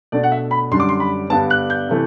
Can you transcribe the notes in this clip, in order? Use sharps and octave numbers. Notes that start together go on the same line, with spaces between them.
B2 A3 D4 D5
F#5
E5
B5
F#2 D3 G3 D4 C6
D6
C6
B5
G2 D3 G3 B3 D4 A5
F#6
G6
C3 E3 A3